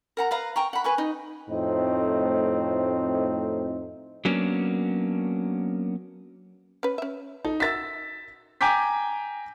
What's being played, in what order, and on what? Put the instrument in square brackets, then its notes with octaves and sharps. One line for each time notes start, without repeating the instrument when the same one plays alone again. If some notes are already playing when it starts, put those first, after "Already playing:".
[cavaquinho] A#4 F#5 A#5
B4 F5 A#5
G5 A#5 C#6
F#5 B5
B4 G#5 C#6
D#4
[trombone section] F2 A2 A3 C4 D#4
[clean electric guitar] F#3 A#3 B3 C#4 D4
[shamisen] C#4 B4
C#4 E5
[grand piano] D#4 [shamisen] A4
[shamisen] F#4 A#4 E5 [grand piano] E6 A6 B6
[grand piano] G5 G#5 A#5 D6 G6 B6